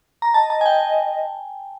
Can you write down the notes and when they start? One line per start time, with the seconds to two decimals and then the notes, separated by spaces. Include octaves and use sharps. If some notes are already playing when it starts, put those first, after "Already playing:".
0.22 A#5
0.34 D#5 A5
0.50 A5
0.61 G#5
0.66 G5